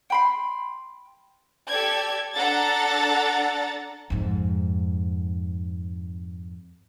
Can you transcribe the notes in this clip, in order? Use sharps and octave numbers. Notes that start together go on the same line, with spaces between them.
G5 B5 C6
G4 A4 D5 G#6
D4 A4 F#5 A#5 A6
F2 G#2